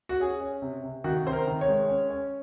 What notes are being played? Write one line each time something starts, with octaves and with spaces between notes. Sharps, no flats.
F#4
C#4 G#4
C#4
C3
C3
D#3 F#4
C3 C5
A#4
D#3
C#5
G#3
C#4
C#4